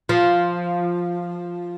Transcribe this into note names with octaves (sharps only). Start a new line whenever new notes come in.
F3